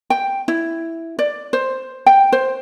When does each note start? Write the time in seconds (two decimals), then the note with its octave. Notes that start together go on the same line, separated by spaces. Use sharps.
0.10 G5
0.48 E4
1.19 D5
1.53 C5
2.06 G5
2.32 C5